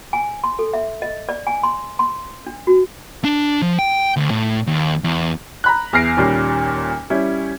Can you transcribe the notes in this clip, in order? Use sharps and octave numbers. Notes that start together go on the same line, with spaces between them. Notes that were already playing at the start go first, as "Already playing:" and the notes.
G#5
C6
A4
E5
D#5
D5
G#5
C6
C6
D4
F#4
D4
F3
G5
D2
A2
D#2
E2
A#5 B5 F#6
E2 F6 A#6 C7 D7
D#2 A#2 G3 C#4
G3 C#4 E4